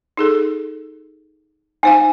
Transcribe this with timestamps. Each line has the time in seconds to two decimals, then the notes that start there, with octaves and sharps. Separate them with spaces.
0.17 D#4 G#4 A4
1.83 D#4 C5 F5 G#5